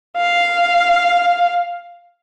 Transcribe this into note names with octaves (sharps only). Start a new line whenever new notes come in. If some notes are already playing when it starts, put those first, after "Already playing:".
F5